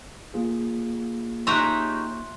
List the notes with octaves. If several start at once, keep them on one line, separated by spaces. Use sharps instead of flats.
A#3 F4 G#4
C#4 D#4 G4 E5 A#5 C6 F#6